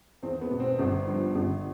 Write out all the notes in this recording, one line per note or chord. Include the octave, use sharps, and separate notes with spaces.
E2 C4
B3
B2
C4
G1
G2 F3
G1